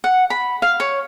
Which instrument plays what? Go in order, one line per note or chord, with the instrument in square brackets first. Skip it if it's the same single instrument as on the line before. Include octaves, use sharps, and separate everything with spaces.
[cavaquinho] F#5
B5
F5
C#5